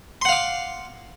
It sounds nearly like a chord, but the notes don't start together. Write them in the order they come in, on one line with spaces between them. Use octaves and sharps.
C6 F#5 F5 D6